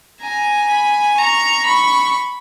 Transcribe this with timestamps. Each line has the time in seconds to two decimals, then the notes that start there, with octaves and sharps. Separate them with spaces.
0.21 G#5 A#5
0.70 B5
1.17 A#5 C#6
1.66 B5 C#6